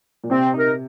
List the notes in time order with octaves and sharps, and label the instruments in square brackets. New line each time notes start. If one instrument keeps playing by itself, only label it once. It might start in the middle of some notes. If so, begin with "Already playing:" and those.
[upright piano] A#2
[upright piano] C3 [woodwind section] C4
[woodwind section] D#4 A#4